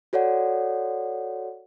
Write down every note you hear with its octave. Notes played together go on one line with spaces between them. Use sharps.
F#4 A4 C#5 D5 F#5